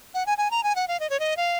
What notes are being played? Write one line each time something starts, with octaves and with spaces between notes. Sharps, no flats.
F#5
G#5
G#5
A#5
G#5
F#5
F5
D#5
C#5
D#5
F5